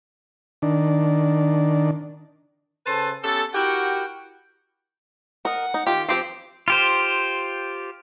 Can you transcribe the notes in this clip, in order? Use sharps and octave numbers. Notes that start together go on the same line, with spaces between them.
D#3 D4
C#3 A4 B4 C5 A5
B3 C#4 G4 A4
E4 F#4 G4 A#4 F#5 G5
A#4 D#5 F#5
D#4
D#3 F4 G4
F3 C4 G4 C5
F4 G4 C5